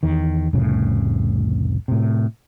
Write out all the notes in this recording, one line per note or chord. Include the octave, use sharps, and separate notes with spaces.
E2 D#3
F1 C2 A2 C#3
A2 C3